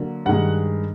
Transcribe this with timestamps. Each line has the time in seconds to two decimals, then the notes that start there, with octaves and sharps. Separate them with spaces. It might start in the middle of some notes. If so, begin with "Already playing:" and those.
Already playing: D3 F#3 A#3
0.26 G2 D#3 G#3 F#5